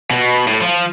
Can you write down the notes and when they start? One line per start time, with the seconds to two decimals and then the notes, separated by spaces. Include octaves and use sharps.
0.11 B2
0.47 A2
0.61 F3